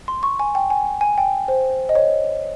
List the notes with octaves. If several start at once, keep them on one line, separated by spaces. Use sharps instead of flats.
C6
C#6
G#5
G5
G#5
G#5
G5
C5
D#5
C#5